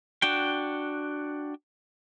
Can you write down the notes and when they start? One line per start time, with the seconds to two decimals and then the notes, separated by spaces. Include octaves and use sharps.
0.22 D4 F#4 G5